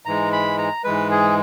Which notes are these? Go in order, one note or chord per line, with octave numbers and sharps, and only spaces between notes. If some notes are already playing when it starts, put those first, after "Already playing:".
G#2 E3 G#3 A#5
B5
A#5
G#2 E3 G#3 B4
G#4